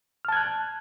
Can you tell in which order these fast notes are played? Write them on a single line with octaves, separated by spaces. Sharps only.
F6 A5 G#6 F#6